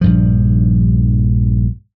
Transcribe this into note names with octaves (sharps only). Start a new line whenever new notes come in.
A#1 G2 F3